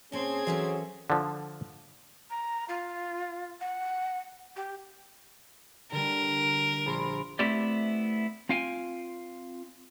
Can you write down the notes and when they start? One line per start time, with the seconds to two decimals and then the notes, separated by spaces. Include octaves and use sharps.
0.12 A#2 C4 C#4 G#4 A5 G#6
0.47 E3 F#3 C#4 A4
1.10 D3 F3
2.30 A#5
2.69 F4
3.61 F#5
4.56 G4
5.92 D3 G3 A#4
6.86 A#1 B5 C6
7.39 A3 B3 C4 E4 G4 D5
8.49 C4 F4 F5 G5 G#5